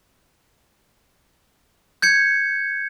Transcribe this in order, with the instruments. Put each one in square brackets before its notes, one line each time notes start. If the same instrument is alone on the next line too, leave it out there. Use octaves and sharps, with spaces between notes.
[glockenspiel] G6 G#6 C#7